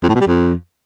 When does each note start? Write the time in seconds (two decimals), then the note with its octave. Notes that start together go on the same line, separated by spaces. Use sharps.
0.03 F2
0.09 A2
0.15 B2
0.21 G3
0.27 F2